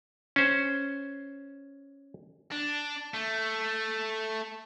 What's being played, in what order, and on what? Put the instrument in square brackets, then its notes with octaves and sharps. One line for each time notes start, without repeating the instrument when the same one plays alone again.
[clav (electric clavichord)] C#4 C5
[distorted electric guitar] D4
A3